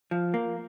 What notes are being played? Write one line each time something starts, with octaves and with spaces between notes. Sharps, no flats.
F3
A#3